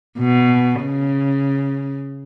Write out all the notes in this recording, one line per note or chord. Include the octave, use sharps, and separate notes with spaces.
B2
C#3